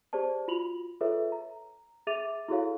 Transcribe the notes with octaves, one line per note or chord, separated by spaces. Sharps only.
G4 G#4 C5 D5 A5
F4 F#4 B5 F7 F#7
F4 G#4 A4 B4 C#5 E5
A#5
G#4 E5 D6 A6 D#7 F7
E4 F#4 G#4 A4 C#5 F5